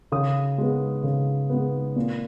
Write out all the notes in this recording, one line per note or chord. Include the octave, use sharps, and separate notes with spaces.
C#3 D#6
G#3 B3
C#3
G#3 B3
A#2